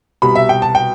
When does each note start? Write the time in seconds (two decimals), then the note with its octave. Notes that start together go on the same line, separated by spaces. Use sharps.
0.22 C2 B2 G3 B5
0.35 E5
0.49 G5
0.62 A5
0.75 G5